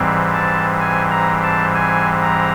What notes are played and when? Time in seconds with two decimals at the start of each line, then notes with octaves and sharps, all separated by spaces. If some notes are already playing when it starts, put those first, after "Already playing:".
Already playing: G#2 E3 G3 C4
0.33 A5
0.80 G#5
1.11 A#5
1.43 A5
1.75 G#5
2.22 A#5